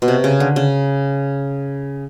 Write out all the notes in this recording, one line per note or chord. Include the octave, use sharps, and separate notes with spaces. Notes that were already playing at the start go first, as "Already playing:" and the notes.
B2
C3
C#3
D3
C#3